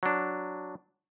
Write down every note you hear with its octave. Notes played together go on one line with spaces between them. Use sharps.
F#3 D4